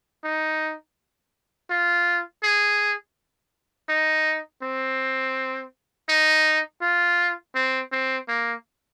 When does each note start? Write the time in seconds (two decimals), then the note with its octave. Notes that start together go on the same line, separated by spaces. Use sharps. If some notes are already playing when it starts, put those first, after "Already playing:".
0.24 D#4
1.70 F4
2.43 G#4
3.89 D#4
4.63 C4
6.09 D#4
6.82 F4
7.55 C4
7.92 C4
8.29 A#3